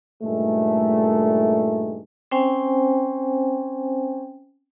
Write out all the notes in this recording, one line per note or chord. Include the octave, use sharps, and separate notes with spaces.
G2 A#2 D#3 G#3 A3
C4 C#4 C5 G5 G#5